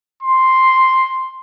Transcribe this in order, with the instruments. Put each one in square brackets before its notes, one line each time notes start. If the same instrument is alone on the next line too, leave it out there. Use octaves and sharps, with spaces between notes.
[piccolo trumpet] C6